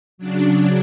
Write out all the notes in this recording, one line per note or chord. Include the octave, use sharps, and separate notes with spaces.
C#3 F#3 D4